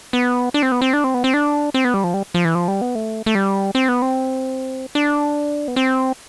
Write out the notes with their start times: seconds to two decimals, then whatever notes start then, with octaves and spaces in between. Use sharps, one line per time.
0.13 B3
0.54 D4
0.63 C4
0.72 B3
0.82 C4
0.93 D4
1.04 C4
1.14 B3
1.24 C4
1.34 D4
1.74 C4
1.85 B3
1.94 G3
2.04 F3
2.14 G3
2.34 F3
2.45 E3
2.55 F3
2.68 G3
2.81 B3
2.95 A3
3.26 A3
3.35 G3
3.75 C4
3.89 B3
4.02 C4
4.95 D4
5.68 B3
5.76 C4